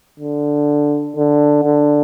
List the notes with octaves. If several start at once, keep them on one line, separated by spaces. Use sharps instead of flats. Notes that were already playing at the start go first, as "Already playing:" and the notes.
D3
D3
D3